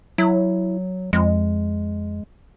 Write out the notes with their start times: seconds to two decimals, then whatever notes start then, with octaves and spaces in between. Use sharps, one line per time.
0.18 F#3 E4
1.13 F2 G#3